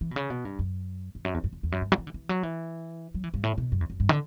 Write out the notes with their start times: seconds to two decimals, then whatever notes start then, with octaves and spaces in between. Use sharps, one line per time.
0.01 E3
0.11 B2
0.16 C#3
0.30 B2
0.45 G2
0.59 F#2
1.15 E2
1.25 F#2
1.34 E2
1.44 F#2
1.53 E2
1.63 E2
1.72 F#2
1.81 G2
1.92 F#3
1.98 E3
2.07 D3
2.14 E3
2.29 F#3
2.43 E3
3.14 F#3
3.24 E3
3.34 G2
3.43 A2
3.58 B2
3.72 F#2
3.81 E2
3.90 F#2
4.00 G2
4.09 D3